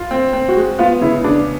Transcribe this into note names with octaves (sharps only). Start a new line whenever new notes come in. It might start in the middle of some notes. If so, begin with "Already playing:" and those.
Already playing: F4
C4
C4
F#4
G#3
B3 F4
C#3 E4
C#3 D4